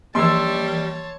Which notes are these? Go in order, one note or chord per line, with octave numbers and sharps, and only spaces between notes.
E3 F3 G3 A#3 C#5 A5 C6 E6